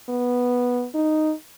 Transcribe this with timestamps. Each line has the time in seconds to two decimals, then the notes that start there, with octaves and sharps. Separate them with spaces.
0.09 B3
0.95 D#4